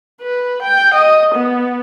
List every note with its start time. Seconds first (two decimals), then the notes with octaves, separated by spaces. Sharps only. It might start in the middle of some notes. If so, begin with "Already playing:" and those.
0.21 B4
0.63 G5
0.94 D#5
1.35 B3